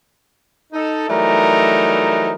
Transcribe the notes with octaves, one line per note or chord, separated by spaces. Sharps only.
D#4 A4
E3 F#3 G3 A3 D#4 A#4